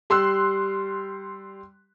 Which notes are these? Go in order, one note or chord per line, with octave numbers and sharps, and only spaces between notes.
G3 C6 E6 F#6